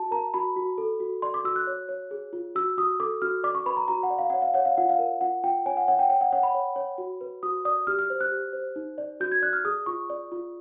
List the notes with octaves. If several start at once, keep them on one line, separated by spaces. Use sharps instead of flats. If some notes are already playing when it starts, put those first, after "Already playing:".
Already playing: F#4 A5
A#4 A#5
F#4 B5
F#4
A4
F#4
D5 C6
D6
F#4 E6
F#6
C#5
C#5
G#4
F4
F#4 E6
F#4 D#6
A4 D6
F#4 F6
D5 D6
C#6
B4 B5
A#5
F#4 A#5
F#5
D5
F5
C#5 F#5
F5
C#5 F#5
F5
F4 F#5
F5
A#4
F4 F#5
F4 G5
C#5 G#5
F#5
C#5 F#5
G5
C#5 G5
F#5
C#5 F#5
B5
C#5
C#5
F#4
B4
F#4 D#6
D5 D#6
G4 F6
F6
C5
F#6
G4
C5
D#4
D5
F#4 G6
G#6
D5 F#6
F6
G#4 D#6
F4 C#6
D5
F4